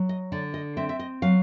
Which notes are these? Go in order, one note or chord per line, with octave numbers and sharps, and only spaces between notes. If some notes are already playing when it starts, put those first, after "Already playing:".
Already playing: F#3
D#5
D3 D5
D#5
C4 E5
E5
D#5
F#3 F5